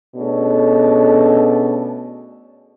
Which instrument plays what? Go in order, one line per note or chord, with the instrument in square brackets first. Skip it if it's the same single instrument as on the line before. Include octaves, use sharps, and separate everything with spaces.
[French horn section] B2 A3 C#4 D4 G#4 A4